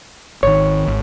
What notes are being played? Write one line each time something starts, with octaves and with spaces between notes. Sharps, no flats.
G#1 D#3 C#5
G#1